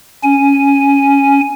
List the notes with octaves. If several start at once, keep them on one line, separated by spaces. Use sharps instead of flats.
C#4 G#5